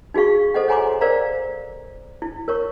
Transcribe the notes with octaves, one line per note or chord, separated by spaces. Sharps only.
D#4 F#4 G#4 F5 C#6
A4 C5 D#5 F#5
C#5 F#5 G#5 A#5 C6 D6
A#4 C5 D5 F5 A#5
E4
A#4 C#5 C#6